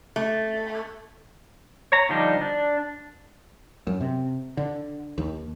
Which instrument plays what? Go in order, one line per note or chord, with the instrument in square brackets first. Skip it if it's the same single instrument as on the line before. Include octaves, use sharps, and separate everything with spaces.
[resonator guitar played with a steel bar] A3
[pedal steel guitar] C#5 A#5
D3 F3 G3 D4 D#4
D4
[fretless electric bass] F#2
C3
D3
D#2